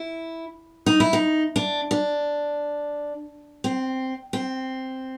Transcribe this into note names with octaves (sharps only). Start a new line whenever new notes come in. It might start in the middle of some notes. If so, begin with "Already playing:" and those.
Already playing: E4
D#4
E4
D#4
D4
D4
C4
C4